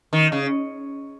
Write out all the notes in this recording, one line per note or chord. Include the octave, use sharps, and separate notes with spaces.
D#3
C#3